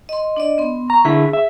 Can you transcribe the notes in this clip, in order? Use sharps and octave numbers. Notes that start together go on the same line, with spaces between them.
D#5 C6
D4 D5 D#5
B3 C6
A#5 C#6
D3 E4 G#4
E5